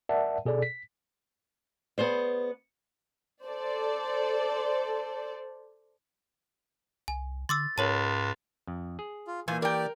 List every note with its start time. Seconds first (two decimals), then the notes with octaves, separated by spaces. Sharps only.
0.09 A#4 D5 E5 F#5 A5
0.45 B2 G#4 A4 D5
0.62 B6
1.98 B3 G#4 C5 D5
3.46 A4 C5 D5
7.08 C2 G#5
7.49 D3 C6 D6 E6 A6
7.78 C#2 G#2 A#4 C#5 A5
8.67 F2
8.99 G#4
9.27 F4
9.48 A#2 E3 A#3 G#5
9.62 G4 A#4 D5 G5